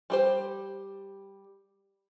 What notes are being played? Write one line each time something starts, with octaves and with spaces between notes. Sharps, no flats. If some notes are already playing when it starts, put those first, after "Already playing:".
G3 G4 C5